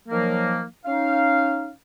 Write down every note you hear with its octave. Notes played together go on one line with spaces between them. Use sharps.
D#3 F3 F#3 A#3
C#4 D#4 F5